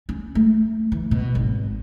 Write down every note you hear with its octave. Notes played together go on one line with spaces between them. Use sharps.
C#4
A3
E3
B2
G#1